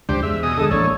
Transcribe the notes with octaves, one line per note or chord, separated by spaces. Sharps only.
C#2 F3 D4 G4 C5
E2 G#3 E5
B2 G#4 D#5 D#6
D3 G#3 A4
A1 A#3 D4 A4 C#5 D5